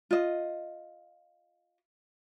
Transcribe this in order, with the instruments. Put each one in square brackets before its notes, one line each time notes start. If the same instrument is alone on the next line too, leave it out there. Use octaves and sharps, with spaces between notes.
[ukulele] F4 D#5